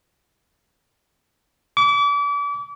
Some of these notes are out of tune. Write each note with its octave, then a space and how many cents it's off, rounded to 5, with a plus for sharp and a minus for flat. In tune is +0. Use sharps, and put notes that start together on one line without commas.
D6 -35